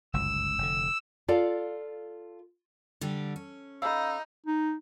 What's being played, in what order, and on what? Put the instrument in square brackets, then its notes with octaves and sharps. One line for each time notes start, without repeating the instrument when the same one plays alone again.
[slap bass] G1 C#2 F#2 [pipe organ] E6
[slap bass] F1 D3
[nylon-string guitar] F4 A4 D5 F5
[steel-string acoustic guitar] D3 G3 G4
C#4
[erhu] D#4 [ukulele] A4 F5 [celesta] B5 E6
[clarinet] D#4